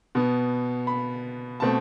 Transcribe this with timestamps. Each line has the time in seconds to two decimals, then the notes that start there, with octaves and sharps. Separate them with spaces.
0.15 B2 B3
0.87 B5
1.60 B2 A3 C4 A5